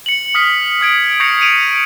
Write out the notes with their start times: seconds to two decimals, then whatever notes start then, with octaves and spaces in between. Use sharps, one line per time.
0.06 C#7 F#7
0.35 D#6 F6 B6 C#7 F#7
0.81 D#6 G#6 D7
1.20 C#6 G6 A#6 C7 C#7 F7
1.41 D7 D#7 F7